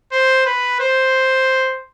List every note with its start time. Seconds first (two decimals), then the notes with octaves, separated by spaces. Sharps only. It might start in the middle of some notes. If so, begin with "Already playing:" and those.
0.12 C5
0.46 B4
0.80 C5